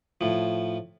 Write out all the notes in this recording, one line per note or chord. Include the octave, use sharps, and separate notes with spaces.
A2 F3